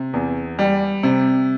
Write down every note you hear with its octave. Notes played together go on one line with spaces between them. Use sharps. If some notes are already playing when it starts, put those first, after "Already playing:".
Already playing: C3
E2
G3
C3